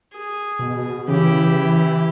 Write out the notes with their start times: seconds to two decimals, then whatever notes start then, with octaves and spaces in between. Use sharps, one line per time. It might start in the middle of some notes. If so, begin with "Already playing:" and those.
0.13 G#4
0.59 B2
1.08 C#3 E3 E4 G4